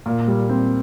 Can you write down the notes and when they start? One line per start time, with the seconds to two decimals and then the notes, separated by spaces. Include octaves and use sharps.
0.06 A#2
0.28 G3
0.49 C4